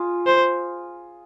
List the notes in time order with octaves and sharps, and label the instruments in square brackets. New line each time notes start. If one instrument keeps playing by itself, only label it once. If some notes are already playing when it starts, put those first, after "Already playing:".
Already playing: [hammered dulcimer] F4 G#4
[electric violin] C5